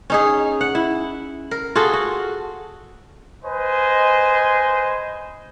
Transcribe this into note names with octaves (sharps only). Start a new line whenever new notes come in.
C#4 D#4 G#4
F#5
E4
A#4
F4 F#4 G#4 A4
F#4
B4 C5 D#5 G#5